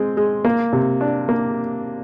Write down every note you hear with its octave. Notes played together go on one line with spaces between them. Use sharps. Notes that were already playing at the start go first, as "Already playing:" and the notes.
Already playing: G#3 C4
G#3
A#3
C3
D4
A#3